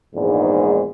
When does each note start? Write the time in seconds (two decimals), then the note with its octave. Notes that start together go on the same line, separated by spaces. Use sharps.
0.15 A#1 E2 G#2